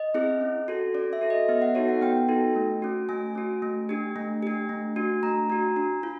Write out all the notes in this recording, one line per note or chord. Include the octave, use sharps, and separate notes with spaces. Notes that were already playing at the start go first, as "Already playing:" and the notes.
Already playing: D#5
C4 E4 G#4
C#4
F#4 A4
C#4 D5
E5
F#4 A4
D#5
B3 E5
F#5
D#4 F#4 A4 C#5
F#5
B3 G5
D#4 F#4 A4
A3
C#4 F#4
A3 G#5
C#4 F#4
A3
D4 G4
A3
D4 G4
A3
D4 F#4
A3 A#5
D4 F#4
D4
F4